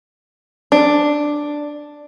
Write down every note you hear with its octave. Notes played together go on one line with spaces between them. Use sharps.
D4